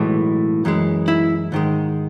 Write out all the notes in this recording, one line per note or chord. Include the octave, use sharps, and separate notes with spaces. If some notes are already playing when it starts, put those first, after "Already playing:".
Already playing: B1 A2 E3 G#3
F#2 E3 G#3
E4
G#2 D#3 G#3